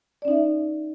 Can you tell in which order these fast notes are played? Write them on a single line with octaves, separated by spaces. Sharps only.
D5 C#4 D#4 E5